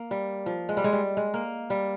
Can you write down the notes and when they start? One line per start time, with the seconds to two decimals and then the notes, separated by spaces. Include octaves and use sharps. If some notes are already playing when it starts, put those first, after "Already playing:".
Already playing: A#3
0.11 G3
0.46 F3
0.69 G#3
0.77 G3
0.84 G#3
0.93 G3
1.17 G#3
1.34 A#3
1.70 G3